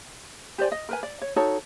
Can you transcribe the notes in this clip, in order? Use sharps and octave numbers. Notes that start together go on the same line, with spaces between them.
G4 C5 D5 G#5
D#5
A#4 B4 G#5
D5
C#5
D#4 F#4 A4 C#5